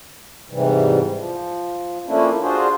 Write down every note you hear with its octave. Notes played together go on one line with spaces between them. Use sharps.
G#2 C3 E3 G3
F3
F3 A3 A#3 C#4 D4 E4
D4 F4 F#4 G#4 C5